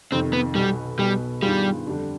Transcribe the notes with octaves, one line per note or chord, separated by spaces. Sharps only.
F2 C3 D#3 C4
B3
B1 B2 G3 B3
B1 B2 G3 B3
G2 D#3 G3 B3 F4 G#4
F2 D3 G3 D4